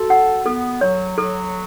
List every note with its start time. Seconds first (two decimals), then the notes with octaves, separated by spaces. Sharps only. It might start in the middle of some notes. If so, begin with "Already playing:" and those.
Already playing: F#4 A4
0.10 F#5
0.45 B3 A4
0.81 F#3 C#5
1.17 F#3 A4